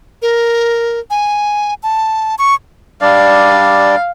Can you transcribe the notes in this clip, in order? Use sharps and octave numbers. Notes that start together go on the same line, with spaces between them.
A#4
G#5
A5
C#6
G3 D4 D5 F5